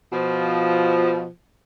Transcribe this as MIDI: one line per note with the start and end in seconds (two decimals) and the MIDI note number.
0.12 1.26 47
0.12 1.26 53